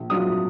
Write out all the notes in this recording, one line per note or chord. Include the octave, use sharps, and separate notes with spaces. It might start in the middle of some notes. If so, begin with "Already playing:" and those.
Already playing: A#1
G#2 F#3 D4 F4 D#6